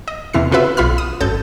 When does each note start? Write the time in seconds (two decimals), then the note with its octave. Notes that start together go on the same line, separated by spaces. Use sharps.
0.08 D#5
0.33 E2 C3 E3 E4 F6 C7
0.52 C#3 F4 F#4 B4 E5
0.77 B1 F4 B5 F6
0.98 D#6
1.21 G#1 F#2 A4 A5 G6 A6